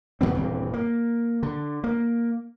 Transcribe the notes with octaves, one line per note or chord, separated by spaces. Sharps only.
C#3 E3 B3 C4
D#1 G2 E3 C4
A#3
D3
A#3